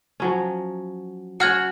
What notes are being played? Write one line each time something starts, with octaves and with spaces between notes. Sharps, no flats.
F3 F#3 C#4
F#3 C#4 F#4 F#5 F6 G#6